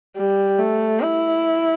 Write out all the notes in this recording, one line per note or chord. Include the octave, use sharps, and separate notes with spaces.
G3
A3
E4